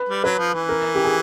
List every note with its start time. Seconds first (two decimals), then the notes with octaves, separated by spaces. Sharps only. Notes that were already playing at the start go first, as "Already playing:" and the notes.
Already playing: B4
0.09 G3
0.24 F#3 B4
0.38 F3
0.54 E3
0.69 A#4
0.95 G4
1.04 G#4